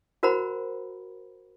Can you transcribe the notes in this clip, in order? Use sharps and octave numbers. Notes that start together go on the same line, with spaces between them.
F#4 A#4 C5 F#5 A#5 B5